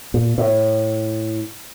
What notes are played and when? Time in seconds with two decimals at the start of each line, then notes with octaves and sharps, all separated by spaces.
0.14 A#2
0.38 A2